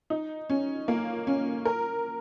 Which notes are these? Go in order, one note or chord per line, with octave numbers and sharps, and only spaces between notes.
D#4
C#4
A#3
C#4
A#4